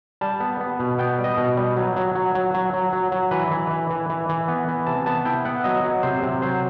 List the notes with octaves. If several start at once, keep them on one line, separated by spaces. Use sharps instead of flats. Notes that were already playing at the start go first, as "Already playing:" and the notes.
G3 A5
B3
B3
B2
B3 G5
G3
D#5
B2
G3
F#3
F#3
F#3
F#3
F#3
F#3
F#3
F#3
E3 B4
E3
E3
E3
E3
E3
B3
E3
C3 A5
B3 A5
E4 G5
B3 F#5
F#3 D#5
F#3
C3 C5
C3
F#3 C5